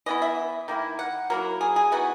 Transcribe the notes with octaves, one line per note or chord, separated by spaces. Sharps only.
E3 B3 E4 D#5
E5
D#3 A#3 E4
F#5
F#3 A#3 E4 A#4
G#4
G#4
E3 B3 D#4 F#4